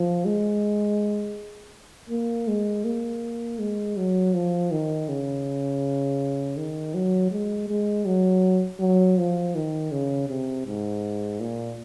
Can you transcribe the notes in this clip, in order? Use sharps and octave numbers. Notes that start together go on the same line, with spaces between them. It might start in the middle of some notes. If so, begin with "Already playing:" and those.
Already playing: F3
G#3
A#3
G#3
A#3
G#3
F#3
F3
D#3
C#3
D#3
F#3
G#3
G#3
F#3
F#3
F3
D#3
C#3
C3
G#2
A#2